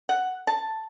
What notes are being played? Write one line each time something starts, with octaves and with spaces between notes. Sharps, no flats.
F#5
A5